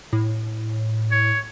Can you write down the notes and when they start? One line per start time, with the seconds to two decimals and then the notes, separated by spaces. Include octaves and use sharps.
0.13 A2
1.11 C#5